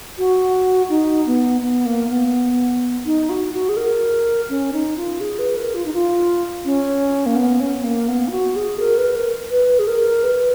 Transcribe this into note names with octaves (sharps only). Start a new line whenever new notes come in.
F#4
D#4
B3
B3
A#3
B3
D#4
F#4
F#4
G#4
A#4
C#4
D#4
F4
G#4
B4
A#4
F4
D#4
F4
C#4
A#3
B3
C#4
A#3
B3
F4
F#4
G#4
A#4
B4
A#4
B4
G#4
A#4
B4